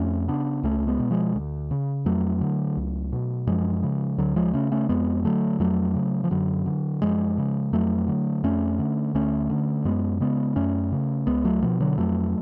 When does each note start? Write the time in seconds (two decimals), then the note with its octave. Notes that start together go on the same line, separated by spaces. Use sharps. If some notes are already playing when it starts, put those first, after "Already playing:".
Already playing: F2 A3 C#4
0.28 C#3 B3 D4
0.63 C#2 A3 C#4
0.87 G#3 B3
0.99 B2
1.11 F3 G#3
1.35 D2
1.71 C#3
2.06 F2 F#3 A3
2.41 D3
2.77 C#2
3.12 B2
3.47 F#2 F3 G#3
3.83 C#3
4.18 D2 D3 F#3
4.36 F3 G#3
4.53 C#3 A3 C#4
4.72 A3 C#4
4.89 F2 G#3 B3
5.24 D3 F#3 A3
5.60 F2 F#3 A3
5.95 C#3
6.24 F3
6.31 F#2 D3 F#3
6.66 D3
7.02 F#2 F3 G#3
7.38 C#3
7.73 F2 F#3 A3
8.08 D3
8.43 F2 A3 C#4
8.79 D3
9.15 D2 A3 C#4
9.50 D3
9.85 F#2 G#3 B3
10.20 C#3 G#3 B3
10.56 F#2 A3 C#4
10.92 C#3
11.27 C#2 G#3 B3
11.45 F#3 A3
11.62 B2 F3
11.80 D3 F#3
11.98 F2 F#3 A3